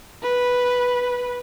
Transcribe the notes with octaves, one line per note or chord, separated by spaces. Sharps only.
B4